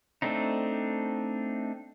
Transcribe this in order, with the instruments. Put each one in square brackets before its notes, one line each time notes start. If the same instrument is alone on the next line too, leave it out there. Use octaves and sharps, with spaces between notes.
[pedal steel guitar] A3 C4 D4 D#4